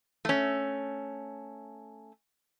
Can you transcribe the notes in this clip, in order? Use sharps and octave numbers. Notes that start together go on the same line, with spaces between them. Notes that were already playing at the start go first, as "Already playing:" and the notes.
A3 C#4